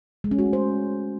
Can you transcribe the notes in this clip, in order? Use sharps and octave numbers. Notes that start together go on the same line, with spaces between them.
G#3
C#4
F#4
A3
C5